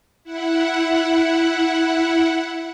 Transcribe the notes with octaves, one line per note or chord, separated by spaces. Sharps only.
E4 F#5